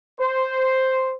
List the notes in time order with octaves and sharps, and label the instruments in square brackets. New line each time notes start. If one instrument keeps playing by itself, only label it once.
[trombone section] C5